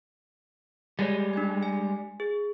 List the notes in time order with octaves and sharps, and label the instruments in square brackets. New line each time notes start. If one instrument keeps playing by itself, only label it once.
[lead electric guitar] G3 G#3 [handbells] G4 C#5
[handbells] D4 G#6
G#5
G#4